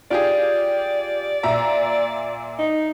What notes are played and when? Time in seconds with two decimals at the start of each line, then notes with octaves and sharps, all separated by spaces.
0.11 F4 G4 G#4 D5
1.43 A#2 E5 A#5
2.59 D#4